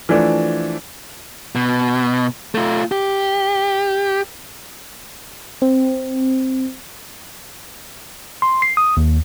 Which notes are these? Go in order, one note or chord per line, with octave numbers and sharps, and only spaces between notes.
E3 F3 A3 D4
B2
A3 F4
G4
C4
C6
C7
D#6
D#2